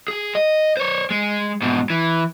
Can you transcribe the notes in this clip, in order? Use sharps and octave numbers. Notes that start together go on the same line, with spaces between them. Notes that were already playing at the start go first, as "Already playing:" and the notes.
G#4
D#5
C5 C#5
G#3
G#2 B2
E3